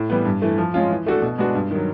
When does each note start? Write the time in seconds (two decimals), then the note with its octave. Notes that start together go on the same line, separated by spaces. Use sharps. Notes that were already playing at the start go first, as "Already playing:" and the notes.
Already playing: A2
0.10 E3 G3 B3
0.25 G2
0.42 E3 A3
0.58 F3
0.74 G#3 C#4 F4
0.90 E3
1.06 A3 D4 F#4 A4
1.22 B2
1.38 G#3 B3 D4 F#4
1.55 G2
1.71 D#3 F#3